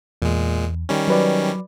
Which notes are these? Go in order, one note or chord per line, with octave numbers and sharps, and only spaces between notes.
E2 A#2 G#3
D#3 G3 C#4
F#3 B4 D5